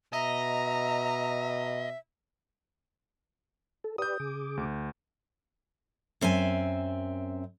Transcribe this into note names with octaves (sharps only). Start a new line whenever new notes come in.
B2 D#5 E5 A#5
A4
G4 B4 D5 D#6 G6
C#3 G#4 D6
D2
F#2 C4 E5 G#5